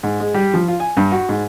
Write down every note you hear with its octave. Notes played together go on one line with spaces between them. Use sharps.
G#2
G#3
G3
F3
F4
G#5
G2
F#4
G#2